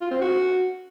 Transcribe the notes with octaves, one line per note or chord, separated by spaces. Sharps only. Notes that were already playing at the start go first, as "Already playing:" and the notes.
F4
C4
F#4